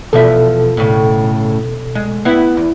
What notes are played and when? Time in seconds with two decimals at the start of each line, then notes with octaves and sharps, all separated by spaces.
0.13 E2 B2 F3 A4 E5
0.77 A2 C#3
1.95 G#3
2.25 B3 E4
2.57 E2